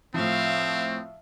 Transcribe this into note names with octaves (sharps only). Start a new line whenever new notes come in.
A2 F3 C4 E5 F5